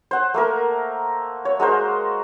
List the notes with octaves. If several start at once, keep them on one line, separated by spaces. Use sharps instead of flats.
C5 F#5
A3 A#3 A#4
C#5
G#3 F#4 A#4 C5